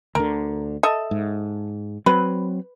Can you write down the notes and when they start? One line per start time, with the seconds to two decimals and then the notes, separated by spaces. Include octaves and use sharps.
0.15 D2 D3 A#4
0.83 A4 D#5 E5
1.11 G#2
2.06 F#3 C4 B4